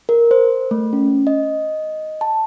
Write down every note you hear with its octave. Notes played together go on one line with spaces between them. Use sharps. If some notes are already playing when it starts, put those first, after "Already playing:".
A#4
C5
A3
C#4
D#5
A5